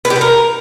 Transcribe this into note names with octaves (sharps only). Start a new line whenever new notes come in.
B4
G4
B4
A#4